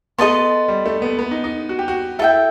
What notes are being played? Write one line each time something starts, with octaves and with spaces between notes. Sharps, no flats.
B3 A4 D#5 A5 C6
G3
A3
B3
B3
D#4
D#4
F#4
G4
F#4
E4 A4 E5 G5